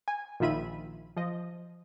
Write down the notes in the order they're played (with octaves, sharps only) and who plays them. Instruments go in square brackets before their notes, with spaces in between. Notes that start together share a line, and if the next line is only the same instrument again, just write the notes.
[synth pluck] G#5
A#1 D#3 F4 E5 B5 D#7
F3 D#5